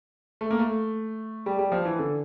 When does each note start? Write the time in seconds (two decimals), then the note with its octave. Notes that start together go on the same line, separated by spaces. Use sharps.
0.41 A3
0.51 A#3
0.59 A3
1.46 G3
1.59 G3
1.72 F3
1.85 E3
1.99 D3